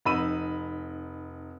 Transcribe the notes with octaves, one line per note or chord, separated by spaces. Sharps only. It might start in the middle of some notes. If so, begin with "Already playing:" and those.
F1 D#4 B5 E6 D#7